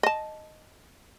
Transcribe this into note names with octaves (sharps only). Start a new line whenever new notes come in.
D#5 A5